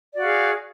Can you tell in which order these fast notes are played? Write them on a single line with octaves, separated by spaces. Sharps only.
D5 F#4 F5 G#4